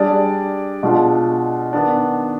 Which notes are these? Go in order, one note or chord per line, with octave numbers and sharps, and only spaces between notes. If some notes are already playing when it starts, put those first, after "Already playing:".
Already playing: G3 D4 G#4 D5
B2 G#3 D4 F4
D#3 B3 D4